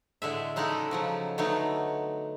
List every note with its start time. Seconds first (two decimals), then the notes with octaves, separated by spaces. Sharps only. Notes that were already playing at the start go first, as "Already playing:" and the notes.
0.22 A2 D3 G#3 E5
0.56 C#3 G#3 D#4 E4 F#4 A4
0.91 C#3 F3 F#3
1.38 D3 F#3 A3 B3 D#4